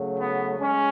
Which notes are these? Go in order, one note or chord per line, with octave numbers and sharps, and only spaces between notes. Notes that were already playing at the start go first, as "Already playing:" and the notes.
Already playing: C#3 F#3 A3
B3
G#3 C#4